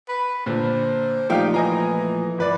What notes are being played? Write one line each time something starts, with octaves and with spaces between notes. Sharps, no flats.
B4
A#2 D3 C5
A#2 F3 A3 D#4 G4 F5 G5
E3 D#5 G#5 A#5
G1 B4 D5